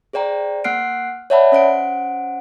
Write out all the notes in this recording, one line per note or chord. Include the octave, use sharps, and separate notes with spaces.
G#4 C5 D5 G5 A#5
A#3 F#5 F6 F#6 C7 D7
C#5 D5 E5 F#5 A5 B5
C#4 C5 F#5 D7